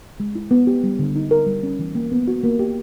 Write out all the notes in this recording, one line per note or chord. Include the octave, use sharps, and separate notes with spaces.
G#3
E4
B3
G4
G3
D3
D#4
A#4
G3
C#4
E3
A#3
B3
F#4
A#3
G4